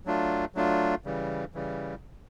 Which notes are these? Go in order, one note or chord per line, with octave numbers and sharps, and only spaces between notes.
F#3 A3 D4 F4
F#3 A3 D4 F4
C#3 E3 G3
C#3 E3 G3